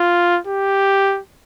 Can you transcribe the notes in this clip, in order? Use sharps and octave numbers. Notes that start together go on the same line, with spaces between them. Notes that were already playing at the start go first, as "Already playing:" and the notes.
Already playing: F4
G4